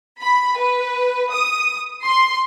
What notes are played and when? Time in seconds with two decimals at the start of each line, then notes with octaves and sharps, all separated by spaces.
0.21 B5
0.58 B4
1.32 D#6
2.04 C6